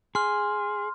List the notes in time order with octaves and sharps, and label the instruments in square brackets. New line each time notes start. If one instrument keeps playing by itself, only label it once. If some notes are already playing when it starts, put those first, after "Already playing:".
[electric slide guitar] G#4 [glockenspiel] C6 F6